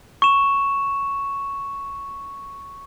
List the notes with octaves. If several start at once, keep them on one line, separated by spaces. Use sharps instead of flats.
C#6 E7